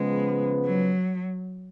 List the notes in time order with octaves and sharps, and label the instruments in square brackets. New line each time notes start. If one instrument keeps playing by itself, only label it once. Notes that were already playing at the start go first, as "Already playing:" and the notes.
Already playing: [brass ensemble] C#3 F3 B3 [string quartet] G#3
[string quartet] F#3